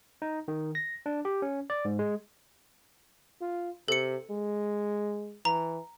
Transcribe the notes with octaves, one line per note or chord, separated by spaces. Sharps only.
D#4
D#3
A#6
D4
G4
C#4
D5
G#2
G#3
F4
C3 A4 C#7
G#3
E3 A#5